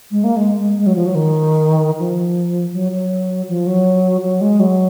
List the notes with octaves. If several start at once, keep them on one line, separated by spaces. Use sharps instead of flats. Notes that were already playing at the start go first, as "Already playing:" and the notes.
G#3
A#3
G#3
G#3
G#3
F#3
F3
F#3
D#3
F3
F#3
F#3
F3
F#3
F#3
G#3
F#3